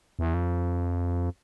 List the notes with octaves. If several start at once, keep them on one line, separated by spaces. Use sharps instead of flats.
E2
F2